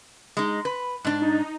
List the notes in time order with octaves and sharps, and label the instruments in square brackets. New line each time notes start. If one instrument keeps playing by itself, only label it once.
[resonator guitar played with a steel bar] G#3 D#4
B4
G#2 D4
[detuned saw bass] D#4